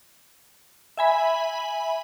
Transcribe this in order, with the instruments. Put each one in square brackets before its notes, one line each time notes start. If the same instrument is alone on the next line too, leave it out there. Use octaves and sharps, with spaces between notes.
[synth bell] E5 G#5 B5